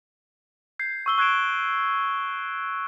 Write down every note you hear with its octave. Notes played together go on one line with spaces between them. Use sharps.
G6 G#6 C7
C#6 E6 G7
C#6 F#6 G#6 C7 D7 E7